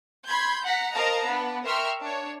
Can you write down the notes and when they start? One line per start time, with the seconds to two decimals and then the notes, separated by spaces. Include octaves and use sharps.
0.28 B5 C6 G6 G#6
0.64 F#5 A#5 B6
0.93 A#4 C5 D#5 F5 A5 A#5
1.26 B3 D4 B4
1.64 A#4 E5 G5 C6 C#6 F6
2.02 D4 C#5